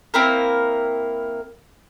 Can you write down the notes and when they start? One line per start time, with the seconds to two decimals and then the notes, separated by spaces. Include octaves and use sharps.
0.14 A#3 C4 E4 A#4